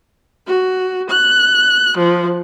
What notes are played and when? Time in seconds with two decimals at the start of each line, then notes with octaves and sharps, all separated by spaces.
0.47 F#4
1.09 F#6
1.97 F3